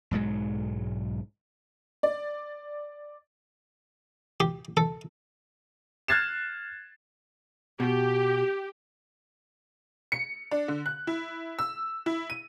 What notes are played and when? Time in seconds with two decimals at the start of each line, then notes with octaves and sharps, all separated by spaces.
0.11 B1 G#2 F#3 G#3
2.03 D5
4.40 G4
4.77 A4
6.08 F6 F#6 G#6 A6 C7 E7
7.80 B2 G4
10.12 C#7
10.51 D4
10.68 D3
10.86 F#6
11.07 E4
11.59 E6
12.06 E4
12.30 D#7